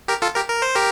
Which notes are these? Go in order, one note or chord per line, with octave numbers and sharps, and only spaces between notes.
G4 A#4
F4 A4
G4 A#4
A#4
C5
G4 A#4